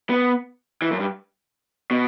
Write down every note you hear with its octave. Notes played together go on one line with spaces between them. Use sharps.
B3
E3
F#2
G2
B2